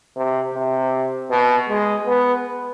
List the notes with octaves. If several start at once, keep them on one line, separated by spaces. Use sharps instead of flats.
C3
C3
B2
G#3
B3